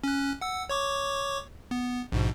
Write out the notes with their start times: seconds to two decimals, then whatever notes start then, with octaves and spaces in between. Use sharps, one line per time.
0.04 C#4 F#6
0.41 F#5 E6
0.69 C#5 C#6 D6
1.71 B3
2.12 A#1 G#2 B2